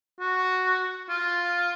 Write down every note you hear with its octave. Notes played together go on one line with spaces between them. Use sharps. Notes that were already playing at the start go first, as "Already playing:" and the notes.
F#4
F4